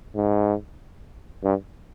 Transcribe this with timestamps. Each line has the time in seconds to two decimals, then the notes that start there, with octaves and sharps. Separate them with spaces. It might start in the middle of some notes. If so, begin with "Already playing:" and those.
0.16 G#2
1.44 G2